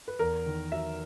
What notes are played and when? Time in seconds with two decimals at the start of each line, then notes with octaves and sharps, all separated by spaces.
0.08 B4
0.19 E2 A#4
0.46 D#3
0.72 F#3 E5